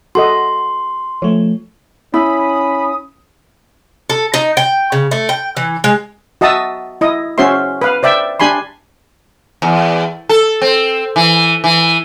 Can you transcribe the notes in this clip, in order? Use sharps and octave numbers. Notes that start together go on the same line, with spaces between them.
F#4 A4 D#5 C6
F3 A3 C#5
C#4 E4 B5 D#6
A4
D#4
G5
C#3
A3
G5
E3
G#3
F#4 D#5 E5 A5 D#6 E6
E4 D#5
C#4 F#4 C5 E5 C6
B4 F5
C5 D5 E5 G5
D4 G4 G#5 B5 C6
E2
A4
C4
E3
E3